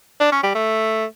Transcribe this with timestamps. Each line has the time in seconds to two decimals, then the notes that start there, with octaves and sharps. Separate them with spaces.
0.21 D4
0.32 C#4
0.43 G3
0.55 A3